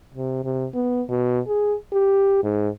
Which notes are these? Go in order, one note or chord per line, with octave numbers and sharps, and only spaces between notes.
C3
C3
B3
B2
G#4
G4
G#2